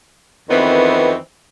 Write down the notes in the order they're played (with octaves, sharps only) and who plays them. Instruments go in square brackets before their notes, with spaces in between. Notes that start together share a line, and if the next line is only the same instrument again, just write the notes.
[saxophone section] F2 D#3 E3 B3 C4